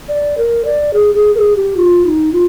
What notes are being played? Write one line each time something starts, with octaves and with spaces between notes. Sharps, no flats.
D5
A#4
D5
G#4
G#4
A#4
G#4
G4
F4
D#4
F4